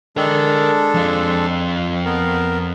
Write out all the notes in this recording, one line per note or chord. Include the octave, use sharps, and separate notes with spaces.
G#3 D4 A4 A#4 G5
F2 F4
B3 A#4